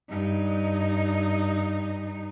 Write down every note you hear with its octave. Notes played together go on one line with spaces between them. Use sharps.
G2 D#4